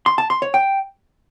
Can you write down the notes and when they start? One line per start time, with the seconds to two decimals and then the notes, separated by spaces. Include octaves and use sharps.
0.06 C6
0.18 A5
0.30 C6
0.42 C#5
0.54 G5